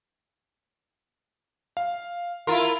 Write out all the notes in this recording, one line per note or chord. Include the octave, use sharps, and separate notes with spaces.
F5
E4 F4 A#4 C6